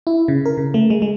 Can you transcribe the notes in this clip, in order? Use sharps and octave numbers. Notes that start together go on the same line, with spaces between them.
E4
C#3
A#4
C#3
A3
G#3
G#3